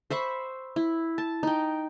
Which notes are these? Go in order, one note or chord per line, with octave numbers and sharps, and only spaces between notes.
C5 E5 B5 C#6
E4
A5
D#4 G5